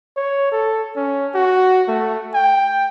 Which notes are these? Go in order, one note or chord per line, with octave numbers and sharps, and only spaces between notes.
C#5
A4
C#4
F#4
A3
G5